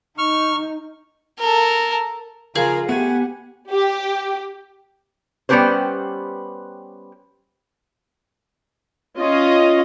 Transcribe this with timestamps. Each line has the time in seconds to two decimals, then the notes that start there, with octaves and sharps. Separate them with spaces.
0.18 D#4 C#6 F6
1.39 A4 A#4
2.55 C#3 F3 F4 G#4 A#4
2.89 A3 B3 G4 F#5 G#5
3.70 G4
5.49 G3 B3 C#4 G4 B4 C5
9.19 C#4 F4 D#5